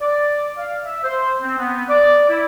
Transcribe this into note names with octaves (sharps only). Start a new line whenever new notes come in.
D5
F5
E5
C5
C4
B3
D5
E4